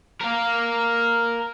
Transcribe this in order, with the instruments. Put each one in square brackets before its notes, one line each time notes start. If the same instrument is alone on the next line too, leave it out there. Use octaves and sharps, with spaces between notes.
[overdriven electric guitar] A#4 F5